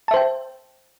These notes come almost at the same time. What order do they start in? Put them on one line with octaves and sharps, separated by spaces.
A5 E5 C5 G5